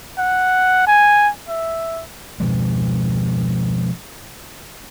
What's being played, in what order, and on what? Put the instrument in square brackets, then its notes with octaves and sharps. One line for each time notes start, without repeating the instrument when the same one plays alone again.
[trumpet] F#5
G#5
E5
[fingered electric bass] B2 F3 G#3